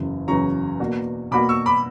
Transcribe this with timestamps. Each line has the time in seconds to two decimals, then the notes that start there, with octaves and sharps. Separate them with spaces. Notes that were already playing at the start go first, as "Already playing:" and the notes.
Already playing: F#1 E2 C#3 F#3
0.27 F#1 E2 C#3 F#3 A#5 C#6
0.79 B2 A#3 D4 F#4
1.31 B2 A#3 D4 F#4 B5 D6
1.49 C#6 E6
1.66 B5 D6